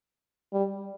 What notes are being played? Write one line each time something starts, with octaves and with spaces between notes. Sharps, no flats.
G3